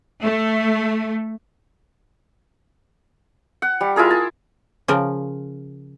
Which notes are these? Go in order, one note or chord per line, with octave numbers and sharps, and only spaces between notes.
A3
F#5
G3
E4 F4 G#4 A#4
A5
C#3 F3 A#4